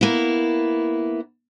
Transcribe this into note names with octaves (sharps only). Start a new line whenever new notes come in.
A#3 B3 E4